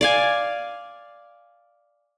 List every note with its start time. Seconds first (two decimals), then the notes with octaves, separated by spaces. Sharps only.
0.01 D5 F5 G#5